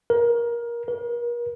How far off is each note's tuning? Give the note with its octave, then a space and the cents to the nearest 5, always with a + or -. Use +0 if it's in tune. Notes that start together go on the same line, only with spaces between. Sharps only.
A#4 +20
A#4 +40